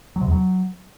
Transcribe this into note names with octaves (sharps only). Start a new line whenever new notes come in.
F#3
C3
E2
F#3